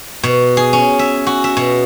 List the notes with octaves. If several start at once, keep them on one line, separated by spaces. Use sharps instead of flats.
B2
G#4
C#4
E5
F#4
E5
B2